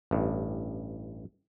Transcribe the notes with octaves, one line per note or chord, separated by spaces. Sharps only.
A1 G2